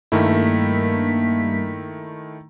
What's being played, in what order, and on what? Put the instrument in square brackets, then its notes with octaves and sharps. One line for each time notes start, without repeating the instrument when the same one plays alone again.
[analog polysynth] G2 A#3 B6 [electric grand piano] D#3 A3 E4